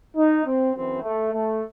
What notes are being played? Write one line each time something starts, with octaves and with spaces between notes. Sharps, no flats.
D#4
C4
F#2 E3 C4
A3
A3